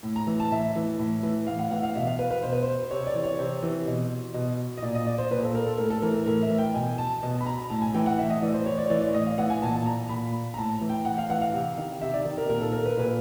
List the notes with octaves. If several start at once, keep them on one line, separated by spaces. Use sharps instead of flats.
A2
A#5
E3
A5
A2 E5
E3
A2
E3
A2 F5
F#5
E3 F#5
F5
B2 E5
F5
B4
B4
B2 C5
B4
C5
C3 C#5
D5
E3
C#5
C3 C5
E3
B2
B2
D#5
A#2 D5
D#5
D5
C5
A#2 B4
A4
A#4
A4
A2 A#4
A4
E3 A#4
A#4
A2 A#4
E5
E3
G5
B2 G#5
A5
B2
B5
A#5
A2 A5
G#5
E3 G5
F#5
A2 E5
D#5
E3 D5
C5
A2 C#5
D5
C#5
E3 D5
D5
A2 D#5
F5
E3 F#5
G#5
A#2 A5
A5
A#5
A#2 B5
A#5
A2 A5
E3
G5
A2 F#5
F5
E3 F#5
F5
C3
D#3
C3 E5
D5
D#3
A#4
A#2 A#4
A4
A#4
B4
A#4
A#2 B4